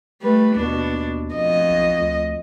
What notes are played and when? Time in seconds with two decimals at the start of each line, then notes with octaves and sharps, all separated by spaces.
0.22 G3 A3 B4
0.56 D#2 B2 D4
1.34 F2 D#5
1.68 B1
1.99 D2